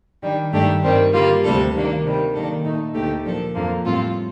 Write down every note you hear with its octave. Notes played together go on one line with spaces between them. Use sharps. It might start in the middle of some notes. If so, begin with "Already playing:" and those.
D#3 G3 D4
G2 D#3 A3 D4 G4
G2 D#3 G3 C4
D3 G3 A#3 F4
D2 C3 G3 D4 A4
D#3 A#3 D4
C3 D#3 G3
D#3 A#3 D4 A4
A#2 A3 D#4
D2 D3 A3 D#4 G4
A#2 F3 A#3 D4 A4
F2 D3 F3 A#3
A2 G3 C4 F4 A4